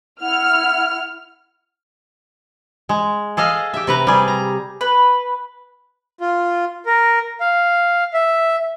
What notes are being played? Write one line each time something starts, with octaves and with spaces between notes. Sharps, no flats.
E4 F#5 F6
G#3
G#4 A4 D#5 F5
G4 E5
C3 B4 A#5
G3 G#4
A#5
B4
F4
A#4
F5
E5